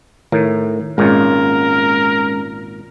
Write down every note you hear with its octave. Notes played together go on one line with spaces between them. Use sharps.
A2 D#3 A3 A#4
G#1 A#2 G#3 C#4 A#4